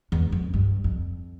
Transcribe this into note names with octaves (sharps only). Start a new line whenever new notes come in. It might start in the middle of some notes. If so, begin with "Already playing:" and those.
E2
F2
G2
F2